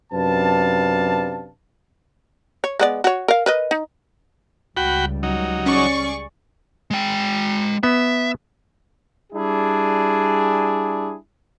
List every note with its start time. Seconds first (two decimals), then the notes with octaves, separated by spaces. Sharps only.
0.12 F#2 C3 D4 B4 F5 A5
2.64 C#5
2.80 G#3 B3 D5
3.04 F#4 C#5
3.28 A#4 F5
3.46 A#4 B4 D#5
3.71 D#4
4.77 C#2 G3 F#4 G5 B5
5.23 F#3 D#4
5.66 C#4 G#4 D5 C#6
6.91 G#3 G5
7.83 B3 E5
9.33 G3 D4 E4 G#4